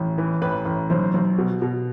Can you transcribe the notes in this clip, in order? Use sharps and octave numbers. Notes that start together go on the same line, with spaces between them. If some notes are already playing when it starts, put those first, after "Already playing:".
Already playing: A1
E3
A1 B4
A1
B1 C5
B1
B2
B2